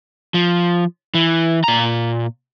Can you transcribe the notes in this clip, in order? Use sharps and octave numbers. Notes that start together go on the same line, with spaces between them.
F3
E3
A#2 A#5